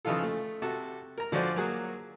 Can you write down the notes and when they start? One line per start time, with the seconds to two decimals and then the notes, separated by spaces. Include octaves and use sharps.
0.05 C#3 E3 F3 D#4 F4 A4
0.23 A3
0.62 C3 F#4 A4 A5
1.18 A#4 A#5
1.32 D3 F3 F#4 C5 D5 G#5
1.56 F#3 A#3 F#4 G#4